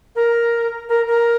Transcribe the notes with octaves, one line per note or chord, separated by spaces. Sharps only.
A#4
A#4
A#4